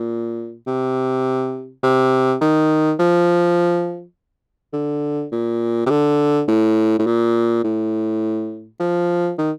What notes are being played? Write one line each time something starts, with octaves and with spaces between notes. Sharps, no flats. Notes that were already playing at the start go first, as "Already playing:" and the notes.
Already playing: A#2
C3
C3
D#3
F3
D3
A#2
C3
D3
A2
A2
A#2
A2
F3
D#3